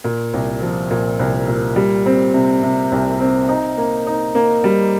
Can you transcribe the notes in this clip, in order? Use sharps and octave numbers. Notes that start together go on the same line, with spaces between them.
A#2
C2
F3
A#2
C2
A#2
G3
C4
C3
C3
C2
C4
D#4
A#3
D#4
A#3
G3